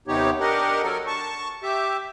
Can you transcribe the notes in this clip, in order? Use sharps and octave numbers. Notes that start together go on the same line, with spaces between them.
D#2 C3 B3 D#4 G4 C#5
D4 G4 A#4 D#5 F#5
F#3 A4 A#4
A5 C#6
G4 E5